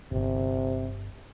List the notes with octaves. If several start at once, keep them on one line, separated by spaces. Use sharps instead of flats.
D1 G1 C3